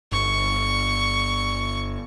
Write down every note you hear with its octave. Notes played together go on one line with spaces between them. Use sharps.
G1 C#6